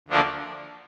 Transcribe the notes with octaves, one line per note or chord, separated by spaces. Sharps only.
D2 D3 F3 A#3 D4